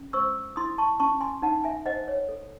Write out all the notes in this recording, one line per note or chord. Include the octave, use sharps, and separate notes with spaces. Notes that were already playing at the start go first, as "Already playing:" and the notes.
Already playing: C#4
C5 C#6 E6
E4 C6 D#6
A5 C#6
C#4 A5 C#6
G#5 C6
D#4 F#5 A5
E5 G#5
C5 D#5 F#5
C#5
A4